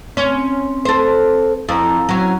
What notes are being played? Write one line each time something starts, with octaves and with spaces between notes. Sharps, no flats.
C4 C#4
A4 C5
F2 E4 A#5
F#3 C#4